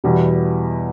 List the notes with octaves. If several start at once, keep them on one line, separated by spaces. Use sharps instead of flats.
E2 B2 G3 B3 E4